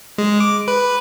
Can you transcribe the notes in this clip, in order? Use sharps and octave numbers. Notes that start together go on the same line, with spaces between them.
G#3
D6
B4